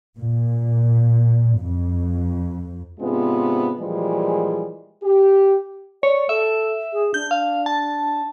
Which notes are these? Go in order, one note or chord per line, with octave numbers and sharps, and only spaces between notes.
A#2
F2
G#2 C3 G#3 B3 D4 F4
A#2 E3 F3 G3 G#3
G4
C#5 D5
A4 E5
G#4
D4 G6
F5
A5